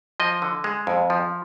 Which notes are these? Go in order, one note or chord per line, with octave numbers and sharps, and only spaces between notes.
F3 D#5
D3
G#3
F2
F3